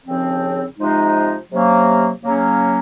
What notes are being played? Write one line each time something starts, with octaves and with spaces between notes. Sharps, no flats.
D#2 C#3 F3 C4
C3 F3 G#3 D#4
C3 F#3 A#3 C#4
C#3 F#3 A#3 C#4